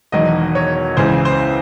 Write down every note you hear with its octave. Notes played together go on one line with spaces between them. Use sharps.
E1 E2 D#3 F#3 D#5
C#5
C#2 C#3 E3 C5
C5